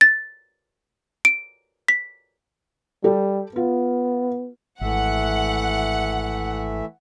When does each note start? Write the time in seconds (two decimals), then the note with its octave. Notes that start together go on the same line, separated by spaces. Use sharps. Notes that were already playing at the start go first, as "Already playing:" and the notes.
0.01 A6
1.25 D7
1.88 B6
3.04 G3 G4 A4
3.56 B3 F4
4.81 G#1 E3 A3 E5 F#5